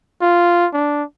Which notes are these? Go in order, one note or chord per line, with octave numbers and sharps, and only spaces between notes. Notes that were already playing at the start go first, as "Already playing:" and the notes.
F4
D4